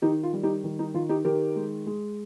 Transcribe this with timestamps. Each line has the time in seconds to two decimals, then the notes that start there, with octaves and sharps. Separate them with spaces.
0.02 D#3 D#4 G4
0.23 F4
0.33 G3
0.43 D#4 G4
0.64 D#3
0.79 D#4
0.94 D#3 F4
1.09 D#4 G4
1.25 D#3 G4 A#4
1.56 G#3
1.86 G#3